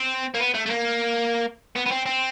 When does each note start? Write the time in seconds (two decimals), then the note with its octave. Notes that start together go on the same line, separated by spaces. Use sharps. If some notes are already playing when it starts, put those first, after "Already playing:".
Already playing: C4
0.34 A#3
0.40 B3
0.54 A3
0.66 A3
0.70 A#3
1.76 B3
1.86 B3
1.91 C4
2.06 C4